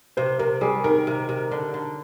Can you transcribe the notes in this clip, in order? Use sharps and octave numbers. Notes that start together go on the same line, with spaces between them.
C3 C5
C3 A#4
G3 G#4
D#3 A#4
C3
C3
D3
D3